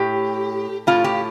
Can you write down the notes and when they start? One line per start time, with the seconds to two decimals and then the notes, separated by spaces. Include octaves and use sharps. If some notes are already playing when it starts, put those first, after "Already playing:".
Already playing: A2 G4
0.87 A2 F4
1.04 G4